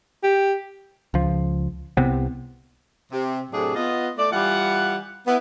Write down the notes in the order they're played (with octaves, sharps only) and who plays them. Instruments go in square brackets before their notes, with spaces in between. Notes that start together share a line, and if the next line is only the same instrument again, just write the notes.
[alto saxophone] G4
[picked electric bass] C#2 F3
C2 C3 B3 C4
[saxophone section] C3
A2 C3 F#3 A3 D4 G#4
B3 F4 D#5
A3 D5
E3 G3 F4 F#5
B3 E4